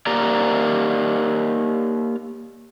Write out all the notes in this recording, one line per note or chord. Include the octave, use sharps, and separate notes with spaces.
A#3 G4 A#4 D5 A#5